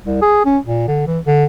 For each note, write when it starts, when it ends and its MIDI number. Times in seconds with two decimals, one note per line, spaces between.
0.05 0.20 36
0.22 0.42 68
0.45 0.58 61
0.65 0.85 46
0.88 1.04 50
1.07 1.19 52
1.26 1.45 50